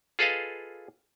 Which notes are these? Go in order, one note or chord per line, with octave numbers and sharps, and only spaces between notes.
F4 G#4 A4 B4 D#5 F5